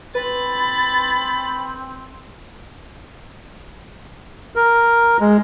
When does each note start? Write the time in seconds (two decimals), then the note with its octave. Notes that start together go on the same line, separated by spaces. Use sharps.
0.15 C4 B4 B5 A6
4.56 A#4
5.20 G#3